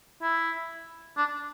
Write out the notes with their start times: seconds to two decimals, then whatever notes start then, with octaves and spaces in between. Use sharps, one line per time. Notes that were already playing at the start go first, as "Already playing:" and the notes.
0.22 E4
1.17 D4